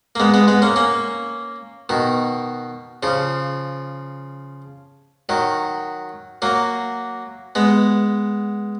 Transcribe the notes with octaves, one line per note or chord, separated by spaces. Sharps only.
A#3
G#3 B3
G#3 B3
G#3 B3
A#3 C#4
A#3 C#4
B2 D#3
C#3 F3
D#3 F#3
F#3 A#3
G#3 B3